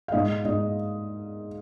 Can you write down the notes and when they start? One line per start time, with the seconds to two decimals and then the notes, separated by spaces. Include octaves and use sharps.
0.08 F5
0.12 G#2 D#5
0.45 G#2 D#5